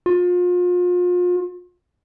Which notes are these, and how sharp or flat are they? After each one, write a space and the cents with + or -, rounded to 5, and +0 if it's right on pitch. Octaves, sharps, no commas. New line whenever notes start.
F4 +35